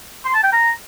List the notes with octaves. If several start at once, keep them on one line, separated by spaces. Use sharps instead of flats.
C6
A5
G5
A#5